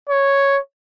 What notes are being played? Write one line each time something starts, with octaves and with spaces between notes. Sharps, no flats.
C#5